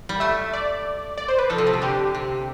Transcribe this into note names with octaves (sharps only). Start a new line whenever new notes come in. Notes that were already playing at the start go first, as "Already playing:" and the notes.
G3
A3 E5
D5
D5
C5
B4
F3 A4
C3
B2
C3
D3 G4
C3